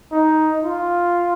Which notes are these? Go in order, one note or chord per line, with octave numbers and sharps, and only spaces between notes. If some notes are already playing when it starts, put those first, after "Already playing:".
D#4
F4